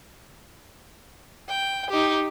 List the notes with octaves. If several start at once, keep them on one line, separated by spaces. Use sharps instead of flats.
G5
D#4 G4